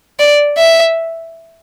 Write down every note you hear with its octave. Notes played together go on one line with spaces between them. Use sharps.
D5
E5